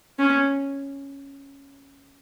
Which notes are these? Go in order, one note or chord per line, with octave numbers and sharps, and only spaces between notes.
C#4